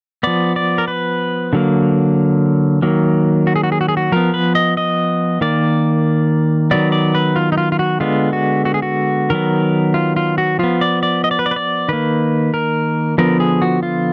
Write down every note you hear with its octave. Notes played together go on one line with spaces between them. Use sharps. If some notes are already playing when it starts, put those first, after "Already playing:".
F3 B3 D5
D5
A#4
B4
D3 F#3 A#3
D#3 F#3 A#3
F#4
G#4
F#4
G#4
F#4
G#4
F#4
F3 B3 A#4
B4
D#5
D#5
D#3 A#3 D5
D#3 F#3 B3 D5
D5
B4
F4
D#4
F4
F4
F#4
D3 G#3 B3 F4
F#4
F#4
G#4
F#4
D#3 F#3 B3 A#4
F4
F4
F#4
F3 B3 F4
D5
D5
D#5
D5
B4
D5
B4
D5
D#3 A#3 B4
A#4
D3 F3 B3 A#4
G#4
F#4
F4